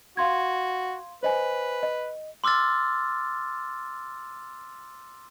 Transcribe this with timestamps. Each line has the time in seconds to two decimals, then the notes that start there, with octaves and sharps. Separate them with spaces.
0.17 F#4 F5 C6 G#6
1.23 B4 C5 D#5 G#5
1.83 D#5
2.44 C6 D6 E6 F6 A6